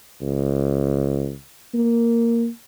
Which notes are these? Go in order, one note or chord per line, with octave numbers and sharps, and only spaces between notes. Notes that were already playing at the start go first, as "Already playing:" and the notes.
C#2
A#3